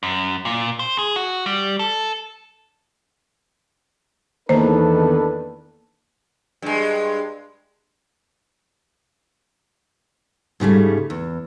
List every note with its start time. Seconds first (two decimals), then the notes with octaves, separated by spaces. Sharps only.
0.03 F#2
0.45 A#2
0.79 C5
0.98 G#4
1.16 F#4
1.46 G3
1.79 A4
4.49 E2 D#3 A#3 D4 A4 B4 C5
6.62 G2 G#3
10.60 G#2 C#3 G3 A3
11.10 E2